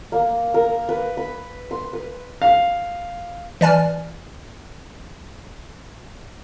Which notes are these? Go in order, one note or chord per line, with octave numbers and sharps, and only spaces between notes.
A#3
A#4
B4
B5
C6
B4
F5
E3 D5 G#5 F6